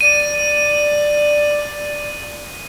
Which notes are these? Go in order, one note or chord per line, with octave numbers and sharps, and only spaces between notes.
D5 D#7